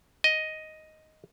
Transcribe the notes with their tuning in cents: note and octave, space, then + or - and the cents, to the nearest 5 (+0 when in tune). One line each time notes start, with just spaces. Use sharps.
D#5 +5